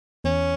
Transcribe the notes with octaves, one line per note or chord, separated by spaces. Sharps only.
E2 C#4